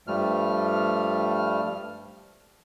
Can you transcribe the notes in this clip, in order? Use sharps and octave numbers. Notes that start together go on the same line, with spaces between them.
G2 F3 G3 A3 F6